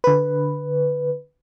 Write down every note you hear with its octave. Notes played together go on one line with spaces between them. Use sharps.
D3 B4